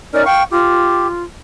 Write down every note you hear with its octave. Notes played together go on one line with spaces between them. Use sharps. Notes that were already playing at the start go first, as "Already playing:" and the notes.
C#4 D#4 A#4 D5
F5 G5 C#6
F4 G4